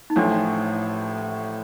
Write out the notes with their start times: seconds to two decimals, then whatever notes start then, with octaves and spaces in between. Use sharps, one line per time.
0.10 D#4
0.16 A1 A2 F3 D4